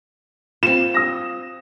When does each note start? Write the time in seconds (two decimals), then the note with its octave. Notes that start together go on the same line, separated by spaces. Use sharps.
0.63 C4 F4 E7
0.94 D#6 A#6